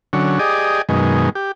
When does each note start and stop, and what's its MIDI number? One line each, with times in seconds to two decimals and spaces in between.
0.13 0.39 50
0.13 0.39 54
0.13 0.39 61
0.39 0.82 67
0.39 0.82 68
0.39 0.82 74
0.39 0.82 75
0.89 1.30 42
0.89 1.30 47
0.89 1.30 51
0.89 1.30 56
1.35 1.52 67